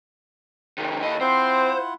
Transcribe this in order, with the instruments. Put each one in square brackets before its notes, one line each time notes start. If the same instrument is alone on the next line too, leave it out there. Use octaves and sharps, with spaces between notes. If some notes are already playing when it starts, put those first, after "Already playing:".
[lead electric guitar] C3 D#3
[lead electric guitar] D#2 D#5 [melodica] E4 A4
[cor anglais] C4 [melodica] E4 F4 F#5 [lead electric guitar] C5